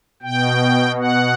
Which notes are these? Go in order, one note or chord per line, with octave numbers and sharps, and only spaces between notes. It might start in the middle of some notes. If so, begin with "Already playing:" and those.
B2 G5
F#5